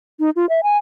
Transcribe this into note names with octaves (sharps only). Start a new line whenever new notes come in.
D#4
F4
E5
G#5